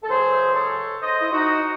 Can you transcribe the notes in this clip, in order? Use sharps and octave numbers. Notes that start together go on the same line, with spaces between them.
A4
C#2 C#3 F#3 G#4 C5
E5
D#5
A4 C#5
C5 D#5
E4
D#4 F#4